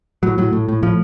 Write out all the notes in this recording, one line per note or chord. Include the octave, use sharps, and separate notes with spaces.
A2 F#3
A2 F#3
A2
A2
A2 F3